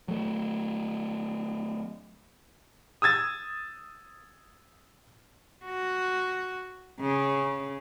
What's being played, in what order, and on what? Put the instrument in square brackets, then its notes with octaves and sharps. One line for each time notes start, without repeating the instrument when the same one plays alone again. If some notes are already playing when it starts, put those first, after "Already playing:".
[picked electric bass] F#3 A3
[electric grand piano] D#6 E6 G#6 A6
[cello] F#4
C#3